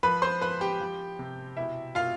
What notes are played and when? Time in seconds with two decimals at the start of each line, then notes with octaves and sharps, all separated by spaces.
0.03 F3 B4 B5
0.22 C5 C6
0.41 F3 B4 B5
0.61 G4 G5
0.81 F3
1.19 C3
1.57 B2 E4 E5
1.95 B2 F4 F5